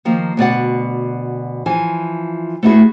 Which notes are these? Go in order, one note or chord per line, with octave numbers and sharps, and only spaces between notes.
D#3 F3 A#3
D2 B2 D5 F#5
E3 F3 G#5
A3 B3 D#4 E4 F#4 G#4